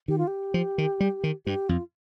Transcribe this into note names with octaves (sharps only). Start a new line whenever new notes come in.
D#3 G4
F4
G4
F3
D#3
G3
D#3
G2 G4
F2 F4